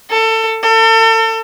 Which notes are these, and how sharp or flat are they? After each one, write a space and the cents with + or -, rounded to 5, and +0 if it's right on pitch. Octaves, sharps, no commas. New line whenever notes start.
A4 +25
A4 +35